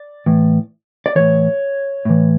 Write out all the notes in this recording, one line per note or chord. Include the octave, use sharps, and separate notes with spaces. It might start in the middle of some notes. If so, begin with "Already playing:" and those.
Already playing: D5
A2 E3
D5
A2 E3 C#5
A2 E3